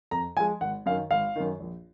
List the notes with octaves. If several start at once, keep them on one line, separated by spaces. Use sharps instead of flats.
F2 A#5
F3 G#3 G#5
G#1 F#5
F#2 D#3 F5
G#1 F5
F#2 D#3
A#1